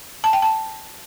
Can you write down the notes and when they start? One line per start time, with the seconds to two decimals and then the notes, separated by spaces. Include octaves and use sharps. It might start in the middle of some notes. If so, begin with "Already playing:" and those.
0.24 A5
0.33 G5
0.42 A5